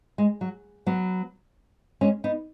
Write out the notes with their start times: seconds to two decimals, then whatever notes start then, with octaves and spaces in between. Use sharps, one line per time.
0.18 G#3
0.41 F#3
0.86 F#3 B3
2.01 G#3 C#4
2.24 B3 D#4